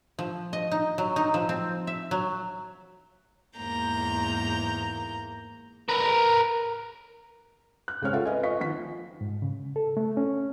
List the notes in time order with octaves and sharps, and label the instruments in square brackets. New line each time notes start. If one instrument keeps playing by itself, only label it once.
[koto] F3
D#5
D#4
F#3
D#4
F3
C4
E5
F#3
[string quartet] E2 G#2 A#3 A#5 G6
[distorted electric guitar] A#4 B4
[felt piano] F#6
C#2 G#3 C4 C5 C#5 F6
F4 A4 E5 F#5
B4 D#5 G#5
F4 D#5 C#6 B6
D#3 F3 F#5 B6
[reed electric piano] G#2
C#3
A4
A3
C#4